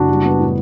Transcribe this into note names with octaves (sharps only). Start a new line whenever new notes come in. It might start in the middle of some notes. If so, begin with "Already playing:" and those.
Already playing: F#1 D4 F#4
G3
B3
A2